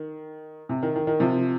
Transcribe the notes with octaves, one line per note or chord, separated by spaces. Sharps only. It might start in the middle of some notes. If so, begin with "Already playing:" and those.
Already playing: D#3
C3
D#3
D#3
D#3
C3 F3